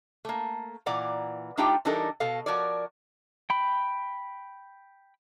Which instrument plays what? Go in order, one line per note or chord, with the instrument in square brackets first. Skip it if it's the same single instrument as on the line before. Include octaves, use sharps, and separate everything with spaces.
[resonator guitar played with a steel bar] A3 A#3
A#2 E3 D5 F#5 A#5
A3 D4 D#4 F4 G4 G5
E3 G3 D4 D#4 A4 A#4
B2 F#4 A4 F5
F3 F#4 A#4 C#5 D5
[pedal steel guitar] G5 B5